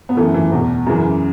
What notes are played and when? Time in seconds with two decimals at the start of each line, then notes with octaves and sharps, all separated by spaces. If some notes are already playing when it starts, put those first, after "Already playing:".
0.09 B3
0.17 F#2 E3 A3
0.34 E3
0.52 E2 B2
0.86 F#2 C#3 E3